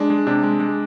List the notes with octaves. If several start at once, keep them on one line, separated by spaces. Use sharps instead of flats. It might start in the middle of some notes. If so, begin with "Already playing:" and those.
Already playing: G#3 D4
G#3
C3 D4
G#3
G#3